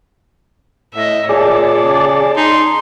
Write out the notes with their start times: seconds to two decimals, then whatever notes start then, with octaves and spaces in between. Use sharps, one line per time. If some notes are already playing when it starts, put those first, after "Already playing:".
0.95 A2 D#5 E5
1.29 A#2 G#4 C#5 D5 A5
1.84 C#3
2.36 D#4 C6